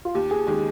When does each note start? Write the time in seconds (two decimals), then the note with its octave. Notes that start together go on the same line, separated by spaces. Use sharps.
0.05 F4
0.15 D#2 G4
0.31 G#4
0.47 D#3 G#3 G4